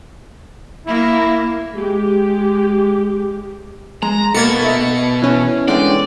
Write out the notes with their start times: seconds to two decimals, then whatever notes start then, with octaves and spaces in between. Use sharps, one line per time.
0.87 A#3 E4
1.73 G#3 G4
4.03 G#3 A#5
4.34 B2 A#3 A4 G#6 A6 C#7
4.64 A4 E5
5.22 E3 C#4
5.68 D3 G#3 D5 G5